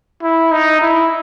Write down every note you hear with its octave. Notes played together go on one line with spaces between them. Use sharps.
E4
D#4
E4